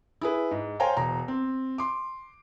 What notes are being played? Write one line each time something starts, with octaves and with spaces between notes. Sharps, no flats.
E4 G#4 B4
G#2
C5 C#5 F5 G5 G#5 A#5
E1 A#5
C4
C6 D6